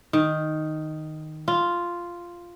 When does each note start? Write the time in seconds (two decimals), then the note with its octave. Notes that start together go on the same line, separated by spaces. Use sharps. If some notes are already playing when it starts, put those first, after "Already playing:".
0.13 D#3
1.48 F4